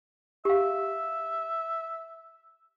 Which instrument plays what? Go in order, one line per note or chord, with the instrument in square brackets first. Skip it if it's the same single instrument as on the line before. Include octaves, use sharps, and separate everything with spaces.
[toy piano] G4 F5 [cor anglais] E5